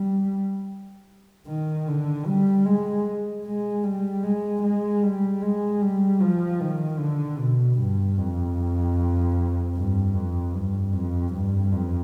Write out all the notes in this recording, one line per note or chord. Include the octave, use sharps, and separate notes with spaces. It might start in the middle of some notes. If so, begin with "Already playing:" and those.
Already playing: G3
D#3
D3
G3
G#3
G#3
G3
G#3
G#3
G3
G#3
G3
F3
D#3
D3
B2
G2
F2
G2
F2
G2
F2
G2
F2